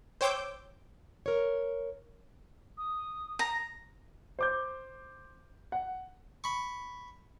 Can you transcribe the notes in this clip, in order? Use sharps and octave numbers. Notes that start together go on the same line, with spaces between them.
C5 C#5 G5 D6 E6 G6
A#4 C#5
D#6
A#5
C5 D6 G6
F#5
B5 C#6